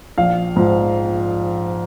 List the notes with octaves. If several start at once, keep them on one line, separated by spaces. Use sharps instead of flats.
A#1 F5
G#2 F3